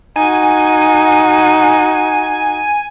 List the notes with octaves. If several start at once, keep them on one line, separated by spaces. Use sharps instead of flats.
D#4 F#4 G#5